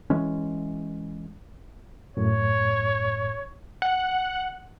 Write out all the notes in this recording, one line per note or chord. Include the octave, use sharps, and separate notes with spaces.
E3 G#3 C#4
F#2 A2 C#5
F#5